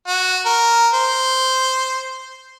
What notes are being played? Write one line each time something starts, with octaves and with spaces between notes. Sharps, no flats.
F#4
A#4
C5